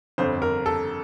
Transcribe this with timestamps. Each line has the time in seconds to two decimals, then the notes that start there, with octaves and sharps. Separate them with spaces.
0.18 G1 F2 D3 C5
0.42 A#4
0.66 A4